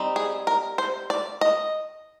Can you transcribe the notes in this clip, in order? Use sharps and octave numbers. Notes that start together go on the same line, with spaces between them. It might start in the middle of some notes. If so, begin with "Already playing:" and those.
Already playing: G3 C4 D#4
G#4
A#4
C5
D5
D#5